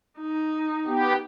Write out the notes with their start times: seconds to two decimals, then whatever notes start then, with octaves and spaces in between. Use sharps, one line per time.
0.19 D#4
0.87 B3 G4